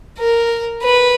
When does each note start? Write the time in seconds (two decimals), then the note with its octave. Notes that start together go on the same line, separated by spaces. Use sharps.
0.19 A#4
0.83 B4